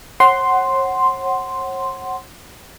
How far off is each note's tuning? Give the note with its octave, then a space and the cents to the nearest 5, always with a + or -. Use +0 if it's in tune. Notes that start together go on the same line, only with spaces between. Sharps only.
C#5 -45 F#5 +15 C6 +0